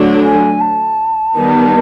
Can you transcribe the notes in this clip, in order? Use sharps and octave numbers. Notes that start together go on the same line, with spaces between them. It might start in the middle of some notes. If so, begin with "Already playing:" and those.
Already playing: D3 F#3 A3 D4
G#5
A5
D#3 G3 B3 D#4